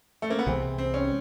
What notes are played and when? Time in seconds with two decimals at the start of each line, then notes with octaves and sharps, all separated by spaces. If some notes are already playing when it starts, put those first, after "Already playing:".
0.22 A3
0.30 A#3
0.39 B3
0.46 C2 C3 E3 G#3 C4
0.78 C4
0.94 C#4